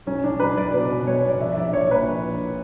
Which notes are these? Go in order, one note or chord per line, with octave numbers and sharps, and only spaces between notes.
B1 C#4
B1 D4
B1 B4
B1 D5
B2 B4
B2
B1 C#5
B2 D5
A#1 E5
E5
A#1 D5
A#1 C#5
A#2 B4
A#1
A#1